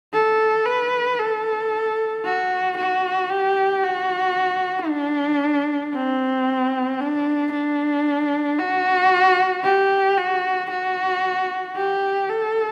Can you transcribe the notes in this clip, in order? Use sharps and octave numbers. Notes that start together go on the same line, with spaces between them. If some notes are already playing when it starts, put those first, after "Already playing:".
A4
B4
A4
F#4
F#4
G4
F#4
D4
C4
D4
D4
F#4
G4
F#4
F#4
G4
A4